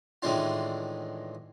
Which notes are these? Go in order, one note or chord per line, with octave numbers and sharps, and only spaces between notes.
A2 D#3 E3 G#3 D4 F4